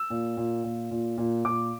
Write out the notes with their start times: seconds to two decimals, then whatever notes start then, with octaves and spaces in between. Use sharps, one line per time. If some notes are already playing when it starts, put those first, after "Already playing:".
Already playing: E6
0.10 A#2
0.37 A#2
0.64 A#2
0.91 A#2
1.18 A#2
1.45 A#2 D6